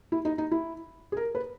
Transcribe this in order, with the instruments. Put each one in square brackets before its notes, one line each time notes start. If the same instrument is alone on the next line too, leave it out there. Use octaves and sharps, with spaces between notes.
[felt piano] E4
D#4
D#4
E4
G#4
A#4
B4